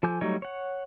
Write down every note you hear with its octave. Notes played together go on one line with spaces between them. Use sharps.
F3 A4 G#5 D6 G6
F#3 G3 A3 D#4 C#5
C#5 F#5